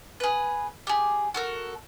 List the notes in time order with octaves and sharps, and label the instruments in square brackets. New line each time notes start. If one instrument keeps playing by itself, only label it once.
[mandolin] G#4 B4
G4 G#4
F#4 A4 A#4